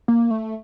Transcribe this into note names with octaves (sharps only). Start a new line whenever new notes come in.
A#3
A3